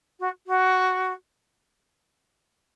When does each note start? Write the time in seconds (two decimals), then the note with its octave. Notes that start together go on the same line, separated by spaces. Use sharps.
0.20 F#4
0.47 F#4